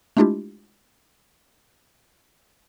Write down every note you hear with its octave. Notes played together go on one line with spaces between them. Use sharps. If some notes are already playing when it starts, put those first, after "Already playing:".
G#3 A3 D4 E4 F4 G4